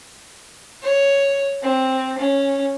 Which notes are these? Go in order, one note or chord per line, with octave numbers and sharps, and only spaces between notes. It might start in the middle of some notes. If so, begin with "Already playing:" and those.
C#5
C4
C#4